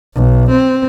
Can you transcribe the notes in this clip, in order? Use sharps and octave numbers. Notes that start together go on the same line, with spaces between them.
B1
C4